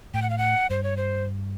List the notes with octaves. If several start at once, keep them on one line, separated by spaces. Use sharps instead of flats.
A2 G5
F#5
F5
F#5
G2 C5
C#5
C5